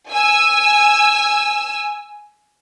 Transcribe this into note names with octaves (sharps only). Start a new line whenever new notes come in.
G#5 E6